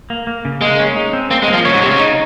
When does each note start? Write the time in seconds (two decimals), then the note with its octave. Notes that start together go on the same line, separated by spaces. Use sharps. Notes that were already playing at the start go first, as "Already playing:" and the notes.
0.10 A#3
0.27 A#3
0.45 C#3
0.61 G#3 A#3
0.79 C#4
0.96 D#4
1.13 C4
1.31 A#3 C4
1.43 G#3
1.48 A#3
1.53 F3
1.65 C#3 C#5
1.74 G#2
1.82 C3 C#5
1.91 C#3
1.99 D#4